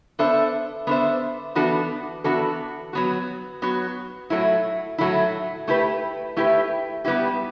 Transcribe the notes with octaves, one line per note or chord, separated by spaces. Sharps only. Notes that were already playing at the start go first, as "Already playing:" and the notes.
B3 D4 A4 C5 E5
B3 D4 A4 C5 E5
E3 B3 D4 F#4 A4
E3 B3 D4 F#4 A4
F#3 B3 F#4
F#3 B3 F#4
A2 F#3 A3 E4
A2 F#3 A3 E4
A3 E4 G4 B4
A3 E4 G4 B4
G3 B3 E4 G4